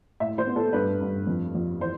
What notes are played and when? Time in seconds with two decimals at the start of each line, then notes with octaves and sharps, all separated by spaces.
0.20 A2 E5
0.38 C5
0.47 B3
0.56 A4
0.73 G2 B4
1.01 G2
1.27 F2
1.55 F2
1.80 E3 C5